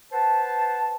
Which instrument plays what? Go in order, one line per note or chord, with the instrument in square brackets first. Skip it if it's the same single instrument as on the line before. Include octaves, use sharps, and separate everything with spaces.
[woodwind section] B4 C5 F#5 A5